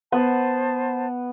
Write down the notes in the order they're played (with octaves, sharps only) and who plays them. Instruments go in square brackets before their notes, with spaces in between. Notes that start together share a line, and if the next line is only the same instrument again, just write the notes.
[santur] B3 [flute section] C5 A5